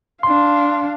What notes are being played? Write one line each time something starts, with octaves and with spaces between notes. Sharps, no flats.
D4 F5 C6